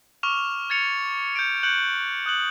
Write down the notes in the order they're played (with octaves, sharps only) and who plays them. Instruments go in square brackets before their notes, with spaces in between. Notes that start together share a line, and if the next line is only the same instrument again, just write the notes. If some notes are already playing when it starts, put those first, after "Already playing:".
[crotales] C#6 D6 F6 E7 F7
G#6 A6 C#7 F7
G6 C#7 D7
F#6 G6 C#7 D7 F#7
D#6 F#6 F#7